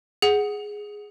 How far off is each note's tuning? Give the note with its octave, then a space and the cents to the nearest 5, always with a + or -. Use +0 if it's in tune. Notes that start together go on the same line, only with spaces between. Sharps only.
G#4 +0 F#5 +0